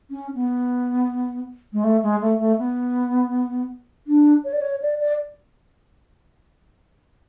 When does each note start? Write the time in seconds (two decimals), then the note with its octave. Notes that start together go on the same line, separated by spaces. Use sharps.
0.10 C#4
0.35 B3
1.73 G#3
1.84 A3
2.03 G#3
2.21 A3
2.39 A3
2.58 B3
4.07 D4
4.44 C#5
4.53 D5
4.61 C#5
4.82 D5
5.00 D5